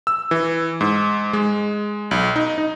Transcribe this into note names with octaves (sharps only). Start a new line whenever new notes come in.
E6
E3
G#2
G#3
B1
D#4
D#4